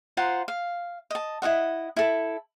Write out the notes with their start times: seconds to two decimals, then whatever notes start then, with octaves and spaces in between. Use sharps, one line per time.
0.17 F4 C5 F#5 A#5
0.48 F5
1.10 D#5 A5
1.42 E4 F#4 D#5 F#5
1.96 E4 A4